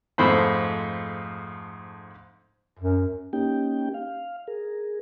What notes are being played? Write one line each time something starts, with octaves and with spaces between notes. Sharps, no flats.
F2 G#2 A3 C5 B5
F#2
A#3 C#4 D#4 G4 G5
F5
G#4 A#4